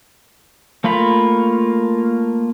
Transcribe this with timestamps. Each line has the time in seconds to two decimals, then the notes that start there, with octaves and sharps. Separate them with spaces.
0.84 A3 A#3 F4 B5